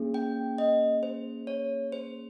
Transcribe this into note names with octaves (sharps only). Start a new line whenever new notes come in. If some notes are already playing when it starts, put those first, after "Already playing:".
Already playing: A#3 C#4 G#4
G5
D#5
C5
C#5
C5